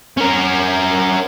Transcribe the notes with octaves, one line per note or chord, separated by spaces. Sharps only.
C#4 A#4